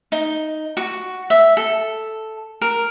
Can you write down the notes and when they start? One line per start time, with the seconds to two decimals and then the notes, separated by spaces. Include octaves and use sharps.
0.12 D#4
0.77 F#4
1.30 E5
1.57 A4
2.61 A#4